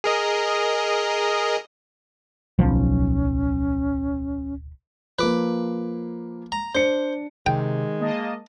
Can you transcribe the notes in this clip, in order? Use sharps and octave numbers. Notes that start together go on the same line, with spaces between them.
G#4 A#4 D#5
D1 B1 F3 C#4
F3 A#3 B4 D6
A#5
D4 C5 C#7
C3 D#3 G#3 G5
A#3 D#5 A5